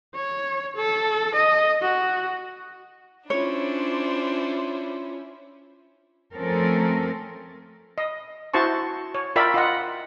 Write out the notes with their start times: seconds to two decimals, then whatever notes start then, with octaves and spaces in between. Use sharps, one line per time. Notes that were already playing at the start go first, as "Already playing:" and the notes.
0.15 C#5
0.77 A4
1.36 D#5
1.82 F#4
3.30 C#4 D4 E4 F4 C5 C#5
6.34 F3 A3 C4 C#4 A4 A#4
7.98 D#5
8.54 E4 F#4 C5 A5 C#6
9.15 C#5
9.36 F4 A#4 D5 E5 G5 B5
9.54 F4 D#5 F#5